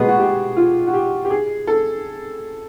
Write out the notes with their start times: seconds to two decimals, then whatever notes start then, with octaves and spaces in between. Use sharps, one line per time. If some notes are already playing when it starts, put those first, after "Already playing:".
Already playing: B2 G#3 B3 G#4
0.08 F#4
0.19 G4
0.57 F4
0.87 F#4
0.94 G4
1.25 G4
1.30 G#4
1.67 A4